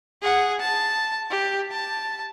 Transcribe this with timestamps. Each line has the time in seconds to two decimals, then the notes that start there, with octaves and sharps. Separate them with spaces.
0.22 G#4 F#5
0.60 A5
1.31 G4
1.71 A5